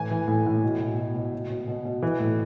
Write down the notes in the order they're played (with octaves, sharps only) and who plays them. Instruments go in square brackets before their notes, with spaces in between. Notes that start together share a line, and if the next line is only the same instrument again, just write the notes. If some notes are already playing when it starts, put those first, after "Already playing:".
Already playing: [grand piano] A2 E3 G#5
E3
A2
A2
B2
B2
B2
B2
B2
B2
B2
B2
E3
A2